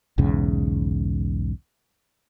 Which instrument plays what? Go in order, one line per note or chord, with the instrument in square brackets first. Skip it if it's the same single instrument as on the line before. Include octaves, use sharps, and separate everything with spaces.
[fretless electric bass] B1 E2 G#2 C#3